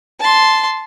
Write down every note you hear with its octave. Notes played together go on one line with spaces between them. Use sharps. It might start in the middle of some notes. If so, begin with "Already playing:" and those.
A5 C6